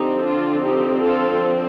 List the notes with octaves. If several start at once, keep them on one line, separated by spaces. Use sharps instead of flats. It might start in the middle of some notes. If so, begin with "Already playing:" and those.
Already playing: D3 F3 C4 D#4 G4
D4 F4
D#4 G4
F4 A4